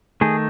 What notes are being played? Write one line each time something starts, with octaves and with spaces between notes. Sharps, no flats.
D#3 A3 D#4 G#4